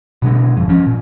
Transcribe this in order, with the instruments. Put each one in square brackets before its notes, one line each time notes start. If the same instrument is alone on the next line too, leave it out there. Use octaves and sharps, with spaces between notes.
[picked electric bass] B2 D3 G#3
G#1 F2
F3 C#4
A#2